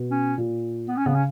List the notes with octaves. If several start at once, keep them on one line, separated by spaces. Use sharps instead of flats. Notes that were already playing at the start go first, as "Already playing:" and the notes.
Already playing: B2
C#4
A#2
B3
C#4
C#3 B3
C#4